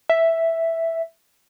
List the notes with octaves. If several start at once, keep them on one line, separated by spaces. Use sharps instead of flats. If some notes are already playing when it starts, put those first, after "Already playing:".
E5